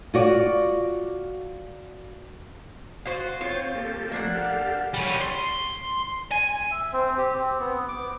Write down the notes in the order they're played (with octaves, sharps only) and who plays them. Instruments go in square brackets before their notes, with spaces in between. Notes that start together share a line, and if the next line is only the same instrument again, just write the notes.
[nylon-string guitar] F4 F#4 D5
[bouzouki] F4 F#4 C5
[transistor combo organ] C4 C#5 G5 [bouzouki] F4
[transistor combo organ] A#3 G4 A4
[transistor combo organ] F3 A3 [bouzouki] A#3 D4 F#5
[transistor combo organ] G4 A4 F5
[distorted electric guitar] G3 C#4
C6
G#5
[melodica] E5
C4
G4
C4
B3
D6